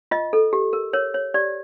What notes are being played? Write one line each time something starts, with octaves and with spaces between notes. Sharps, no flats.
F4 D#5
A4
G4
A#4
A#4 C#5
C#5
G4 D5